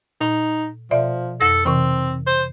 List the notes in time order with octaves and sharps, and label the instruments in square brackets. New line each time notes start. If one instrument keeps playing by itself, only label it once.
[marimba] A#2 [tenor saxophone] D#4
[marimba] B2 D5 E5 [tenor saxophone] F3
[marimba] F2 A#6 [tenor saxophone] A4
[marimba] C3 E3 [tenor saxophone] C4
[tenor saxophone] C5